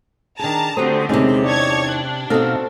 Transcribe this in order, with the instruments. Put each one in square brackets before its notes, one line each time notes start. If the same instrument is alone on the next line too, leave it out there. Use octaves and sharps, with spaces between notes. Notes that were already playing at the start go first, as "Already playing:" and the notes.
[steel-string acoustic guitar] D#3 G#4 [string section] D4 A5 A#5
[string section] D3 C4 [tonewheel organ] A3 D#6 [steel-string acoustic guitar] F#4 G4 C5
[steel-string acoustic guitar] E2 A#3 D#4 [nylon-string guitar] C3 C#4 [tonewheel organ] G#3
[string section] C#5 A5 G#6 [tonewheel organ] D5
[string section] D4 [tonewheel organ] F#6
[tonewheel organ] B2 F5 [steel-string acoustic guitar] C4 F#4 A4 [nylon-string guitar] D#4 D#5